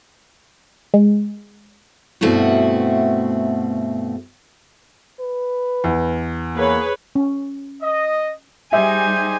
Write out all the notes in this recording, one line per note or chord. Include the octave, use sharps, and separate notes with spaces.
G#3
G2 B2 A3 C4 E4 F#4
B4
E2
A#3 G#4 B4 C#5
C#4
D#5
G3 D#4 G4 G#4 C5 E5 G#5